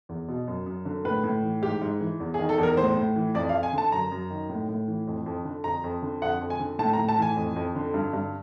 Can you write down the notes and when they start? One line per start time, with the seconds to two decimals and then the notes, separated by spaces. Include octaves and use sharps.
0.09 E2
0.28 B2
0.48 F#2
0.66 F#2
0.85 D3
1.05 A2 B4
1.24 A2
1.43 E3
1.62 G#2 G4
1.81 G#2
2.01 E3
2.20 E2
2.34 G#4
2.39 D#3
2.49 A4
2.58 E2
2.63 A#4
2.77 A2 C5
2.97 A2
3.16 E3
3.34 F2 D5
3.49 F5
3.53 F2
3.63 G#5
3.73 D3 A5
3.92 F#2 A#5
4.12 F#2
4.30 D#3
4.49 A2
4.69 A2
4.88 E3
5.07 F2
5.26 F2
5.45 D3
5.64 F2 A#5
5.84 F2
6.02 D3
6.22 F2 F#5
6.41 F2
6.50 G#5
6.60 D3
6.79 A2 A5
6.93 A#5
6.98 A2
7.09 A5
7.18 E3 G#5
7.37 F2
7.56 F2
7.75 D3
7.94 G2
8.13 G2